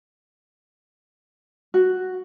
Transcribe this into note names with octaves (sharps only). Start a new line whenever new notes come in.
F#4